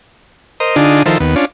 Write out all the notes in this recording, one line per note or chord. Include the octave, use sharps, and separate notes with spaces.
A#4 C5 D#5
D3 D4 D#4 F4 G#4
D#3 F3 E4 A4 A#4 C5
D#2 B3
C#4 D4 F4